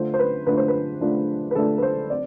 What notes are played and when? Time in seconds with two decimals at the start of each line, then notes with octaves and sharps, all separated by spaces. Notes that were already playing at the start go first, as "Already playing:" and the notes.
Already playing: D3 A3 D4 F4 C5
0.14 C5
0.19 B4
0.46 D3 A3 D4 F4 B4
0.57 C5
0.68 B4
1.01 D3 A3 D4 F4
1.51 B4
1.55 D3 A3 D4 F4 A4
1.78 B4
1.83 C5
2.10 C4 D5